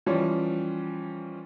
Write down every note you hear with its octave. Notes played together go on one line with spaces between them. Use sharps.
E3 F3 G3 C#4